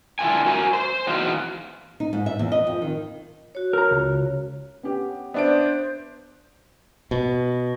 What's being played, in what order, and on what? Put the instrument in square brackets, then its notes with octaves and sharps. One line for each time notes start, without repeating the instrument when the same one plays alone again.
[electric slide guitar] D3 E4 F4 G#5
F#4 A#4 G#5
C5
E2 B3 D#4 F#4 F5
[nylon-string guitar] D#4
G#2
E5
E2
D#5
F2
D#3
[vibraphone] F#4 C#5
[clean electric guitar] A#4 A#5
C#2
[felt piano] B3 C#4 G4
[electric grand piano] B3 D4 D7 [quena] C5 [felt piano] D5 E5
[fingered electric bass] B2